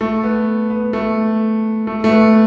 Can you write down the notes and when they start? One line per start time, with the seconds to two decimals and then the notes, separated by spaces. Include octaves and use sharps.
0.01 A3
0.23 B3
0.70 B3
0.93 A3
1.87 A3
2.04 A3
2.10 B3